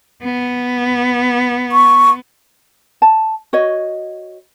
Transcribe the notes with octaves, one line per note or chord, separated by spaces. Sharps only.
B3
C#6
A5
F#4 C#5 D#5